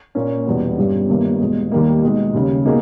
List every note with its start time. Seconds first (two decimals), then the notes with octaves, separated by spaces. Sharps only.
0.15 A#2 A#3 C#4
0.46 E1 E2 B2 G3 B3
0.77 G1 G2 G3 C#4
1.09 G1 G2 D#3 A#3 C#4
1.40 E2 B2 G#3
1.72 D#2 D#3 G3 A#3
2.03 B2 G#3 D#4
2.34 D#2 C#3 G3
2.65 B2 A#3 D#4 G#4